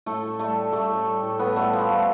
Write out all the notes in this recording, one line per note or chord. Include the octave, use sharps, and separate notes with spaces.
A2 A3 A4
A2
G3 A3 A4
G3
G3 A3 A4
A2
G3
A2
A2 B3 B4
G3 A3 A4
F3 G3 F4
G3 A3